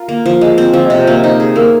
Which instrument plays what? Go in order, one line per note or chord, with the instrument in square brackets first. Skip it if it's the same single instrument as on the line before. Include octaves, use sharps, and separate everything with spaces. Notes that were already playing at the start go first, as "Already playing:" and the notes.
Already playing: [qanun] F4 A#4
A#3
F3
G#3
C4
F3
[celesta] D#5
[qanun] C3 [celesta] C5
[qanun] A#3
D#4
G#4
[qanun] A#3 [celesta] A#4